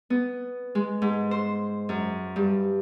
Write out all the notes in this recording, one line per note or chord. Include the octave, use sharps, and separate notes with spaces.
B3
G#3
G#2
C5
F#2
G2